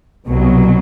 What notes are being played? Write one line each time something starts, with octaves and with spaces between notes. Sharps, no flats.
C2 B2 F#3